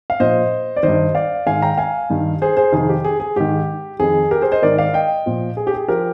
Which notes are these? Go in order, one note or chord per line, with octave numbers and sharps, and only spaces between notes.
F5
A#2 F3 C5 D#5
D5
G2 D#3 C5 D#5
D5 F5
G#2 D#3 F5 G#5
G5 A#5
F5 G#5
G2 D#3
G#4 C5
G#4 C5
F2 C3 D#3 G#4
G4
G#4
G#4
G#2 D#3 G4
F2 D#3 G#4
G4 A#4
G#4 C5
C5 D#5
G#2 D#3 A#4 D5
D5 F5
D#5 G5
A#2 F3
G#4
G4
G#4
F3 G4 A#4